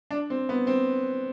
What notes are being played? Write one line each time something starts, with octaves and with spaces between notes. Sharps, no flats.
D4
C4
B3
C4